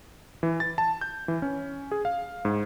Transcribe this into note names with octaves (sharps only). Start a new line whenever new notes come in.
E3
A6
A5
G6
E3
C#4
G#4
F5
G#2